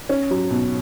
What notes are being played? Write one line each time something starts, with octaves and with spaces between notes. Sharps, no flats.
C#4
F#3
B2